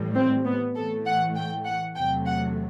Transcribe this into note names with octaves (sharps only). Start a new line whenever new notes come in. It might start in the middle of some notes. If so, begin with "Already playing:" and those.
Already playing: A2 E3 G3
C4
B3
A2 E3 A3 A4
F#5
G5
F#5
E2 C3 F#3 A3 G5
F#5